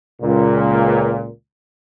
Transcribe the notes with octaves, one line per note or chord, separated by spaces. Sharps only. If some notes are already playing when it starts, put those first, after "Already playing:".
C#2 A#2